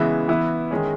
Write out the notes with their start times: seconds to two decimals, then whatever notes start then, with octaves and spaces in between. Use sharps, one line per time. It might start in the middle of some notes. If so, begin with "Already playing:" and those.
Already playing: C#3 E3 G#3 B3 E5
0.28 E3 B3 E4
0.71 D#3 G#3 C#4